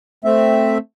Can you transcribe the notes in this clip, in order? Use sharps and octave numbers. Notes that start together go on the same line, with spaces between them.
A3 C4 E5